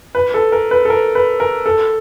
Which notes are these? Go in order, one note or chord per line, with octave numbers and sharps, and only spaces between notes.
B4
A4
A#4
B4
A4
A#4
B4
A#4
A4